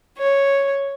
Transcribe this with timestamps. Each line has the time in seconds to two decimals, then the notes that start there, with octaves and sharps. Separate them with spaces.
0.16 C#5